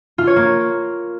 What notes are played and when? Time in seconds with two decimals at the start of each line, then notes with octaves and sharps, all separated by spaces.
0.18 F4
0.27 C#5
0.36 A#3